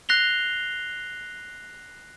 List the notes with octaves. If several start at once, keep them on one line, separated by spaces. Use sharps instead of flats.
F#6 A#6 C7 F7 G7